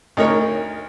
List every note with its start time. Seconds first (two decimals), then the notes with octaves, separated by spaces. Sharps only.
0.17 D2 D#4 A#4 C#5